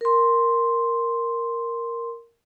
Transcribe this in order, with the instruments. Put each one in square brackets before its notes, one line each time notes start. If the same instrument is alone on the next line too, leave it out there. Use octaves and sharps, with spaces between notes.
[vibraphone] A#4 C6